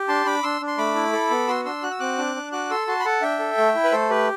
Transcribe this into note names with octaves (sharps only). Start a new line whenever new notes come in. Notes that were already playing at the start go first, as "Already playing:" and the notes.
Already playing: G4
D4 A5 C6
D4 B5 D6
D4 C6 E6
D4
C6
A3 B5 D6
E4
A4
B3
F#4 C6 E6
D4 C6 E6
F#4 F#6
E6
C4 D6 F#6
D4
D4
F#4 D6 F#6
A4 C6 E6
F#4 A5 C6
B5
A4 F#5 A5
D4 E5 G5
A4
A3
E4
B4
A3 A4 C5
G4 B4